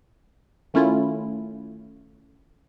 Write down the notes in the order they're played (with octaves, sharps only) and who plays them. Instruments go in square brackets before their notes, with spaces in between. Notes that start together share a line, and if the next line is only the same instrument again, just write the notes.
[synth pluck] D#3 A3 C#4 E4 F4